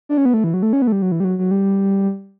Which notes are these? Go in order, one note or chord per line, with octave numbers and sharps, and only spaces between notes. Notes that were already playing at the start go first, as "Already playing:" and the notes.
D4
C#4
B3
A3
E3
F#3
A3
C#4
B3
A3
G3
F#3
E3
G3
F#3
F#3
G3